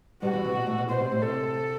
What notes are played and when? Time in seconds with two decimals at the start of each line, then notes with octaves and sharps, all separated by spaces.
0.22 G2 G3 F#4
0.33 E2 E3
0.44 C3
0.55 B2
0.67 A2
0.78 B2
0.89 B2 C5
1.00 C3
1.12 A2
1.23 C3 A4